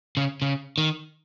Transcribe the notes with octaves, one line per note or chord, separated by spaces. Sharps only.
C#3
C#3
D#3